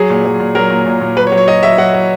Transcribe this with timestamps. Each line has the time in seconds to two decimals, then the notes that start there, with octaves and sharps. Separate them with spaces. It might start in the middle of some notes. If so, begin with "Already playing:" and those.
Already playing: F#3 G#4
0.10 A#2
0.25 F#3
0.40 A#2
0.55 F#3 A#4
0.70 A#2
0.86 A#2
1.01 A#2
1.17 F#3 B4
1.27 C#5
1.32 F#3
1.37 C#5
1.48 F#3 D#5
1.63 F#3 E5
1.78 F#3 F#5
1.94 F#3